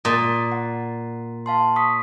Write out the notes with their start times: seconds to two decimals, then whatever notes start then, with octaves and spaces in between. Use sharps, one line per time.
0.05 A#2 D#6 A6
0.52 F#5
1.46 F5 A5 C6
1.76 C#6 D#6 B6